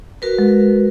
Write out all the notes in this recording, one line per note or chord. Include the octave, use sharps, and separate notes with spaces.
F#4 A#4 B4
G#3